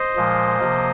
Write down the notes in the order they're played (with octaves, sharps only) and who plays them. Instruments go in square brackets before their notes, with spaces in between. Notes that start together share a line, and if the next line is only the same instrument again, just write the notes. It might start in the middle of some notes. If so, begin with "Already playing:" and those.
Already playing: [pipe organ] C5 D#5
A#2 F3 G#3
C3 F3 A#3